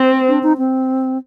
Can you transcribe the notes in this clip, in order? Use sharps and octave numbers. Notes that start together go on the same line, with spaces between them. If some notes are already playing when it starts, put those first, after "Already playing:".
Already playing: C4
D4
D#4
C4